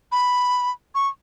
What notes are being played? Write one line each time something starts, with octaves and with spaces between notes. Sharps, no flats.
B5
C#6